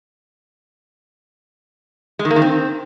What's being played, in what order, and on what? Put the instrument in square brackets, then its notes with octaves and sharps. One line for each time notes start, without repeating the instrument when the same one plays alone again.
[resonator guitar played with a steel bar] G#3
D#3
A#3
D#3
C4